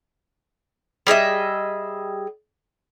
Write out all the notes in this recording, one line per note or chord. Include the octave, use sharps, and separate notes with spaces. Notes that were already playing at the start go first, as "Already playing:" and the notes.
G3 G#4 D#5 E5